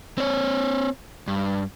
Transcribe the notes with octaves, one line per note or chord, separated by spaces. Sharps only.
C4 C#5
G2